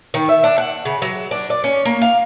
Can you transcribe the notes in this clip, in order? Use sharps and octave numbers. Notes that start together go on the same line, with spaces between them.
D#3
E5
D4
F#5
C#3
F#3
D4
D5
C#4
A#3
F5